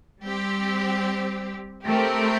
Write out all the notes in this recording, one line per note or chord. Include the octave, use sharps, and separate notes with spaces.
G3 C4 G4
A3 C4 G4 A#4